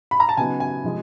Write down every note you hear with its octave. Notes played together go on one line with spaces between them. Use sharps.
B5
A#5
A5
C#3 F#3 B3 D#4 G#5
G#5
C3 F3 G#3